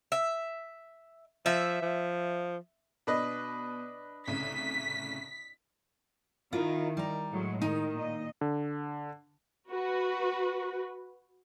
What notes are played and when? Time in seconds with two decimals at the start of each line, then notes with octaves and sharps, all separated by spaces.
0.12 E5
1.46 F3 E5
1.82 F3
3.07 B2 D4 B4 D#5
4.28 C2 A2 C#3 B6
6.52 D#3 E4 F4 A#4
6.97 G3 A#5
7.32 A2 F#3 G#3
7.62 D#3 D#4
7.95 A#2 D#5
8.41 D3
9.70 F#4 B4